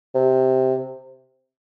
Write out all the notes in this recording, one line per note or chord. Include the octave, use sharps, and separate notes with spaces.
C3